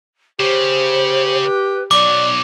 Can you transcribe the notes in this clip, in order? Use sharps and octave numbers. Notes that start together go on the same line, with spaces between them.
C#3 G4 C5
B4
B1 F#3 D5 D6